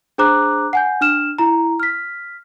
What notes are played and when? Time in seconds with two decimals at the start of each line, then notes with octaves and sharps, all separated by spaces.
0.18 D4 G#4 C5 A#5 D6 F#6
0.73 F#5 G#5 G6
1.01 D4 F6 E7
1.39 E4 A#5
1.80 F6 B6